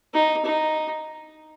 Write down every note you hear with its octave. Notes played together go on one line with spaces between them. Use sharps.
D#4
D#4